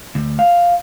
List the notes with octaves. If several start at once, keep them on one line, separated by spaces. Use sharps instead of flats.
D2
F5